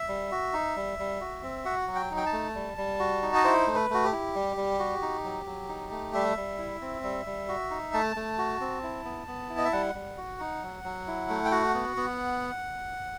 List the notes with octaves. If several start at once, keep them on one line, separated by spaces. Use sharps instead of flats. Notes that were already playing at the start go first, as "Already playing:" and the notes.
Already playing: E5
G3
F#4
D#4
G3
G3
F#4
C4
F#4 F#5
F#3
G5
D#4
G5
A5
A3
G3
G3
F#4
D#4
D#5
E4 C5
A3
B4
A3 F#4
G4
E4
G3
G3
F#4
D#4
F#3
F#3
D#4
A3
G3 E5
G3
E4
C4
G3
G3
F#4
D#4
A3 A5
A3
F#4
C4
E4
B3
B3
E4
D#5
E5
G3 F#5
G3
F#4
D#4
F#3
F#3
E4
A3
G5
F#4 F#5
B3
B3